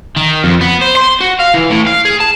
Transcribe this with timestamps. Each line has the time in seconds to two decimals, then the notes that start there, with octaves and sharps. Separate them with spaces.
0.16 D#3
0.44 F2
0.61 B3
0.81 C5
0.97 C6
1.20 F#4
1.39 F5
1.54 E3
1.70 A2
1.86 F5
2.05 G#4
2.20 A5